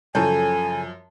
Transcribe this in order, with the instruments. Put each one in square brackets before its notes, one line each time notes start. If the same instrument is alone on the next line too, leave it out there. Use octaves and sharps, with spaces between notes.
[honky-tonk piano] F#2 F3 [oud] C#3 A4 [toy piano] C#5 A5 [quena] G#5